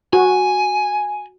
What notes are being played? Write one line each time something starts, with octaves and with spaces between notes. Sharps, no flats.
F#4 G#5